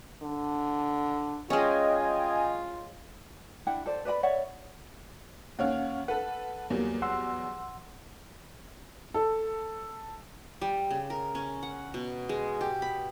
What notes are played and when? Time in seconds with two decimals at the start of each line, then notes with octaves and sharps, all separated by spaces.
0.22 D3
1.50 G#3 C#4 F4 D#5 G5 G#5
3.67 D4 E4 F#5 G5
3.86 A4 C5 D5
4.05 B4 D5 D#5 B5
4.23 C#5 D5 E5 F#5
5.59 D#2 C#4 C#5 F5 F#5 F6
6.08 A4 B4 F#5
6.70 E2 F#3 G3 A#3
7.02 F#5 C6 E6
9.14 A4
10.61 G3
10.91 C#3
11.10 A#4
11.35 C#4
11.63 F#5
11.94 B2
12.29 G#3
12.61 G4
12.82 B5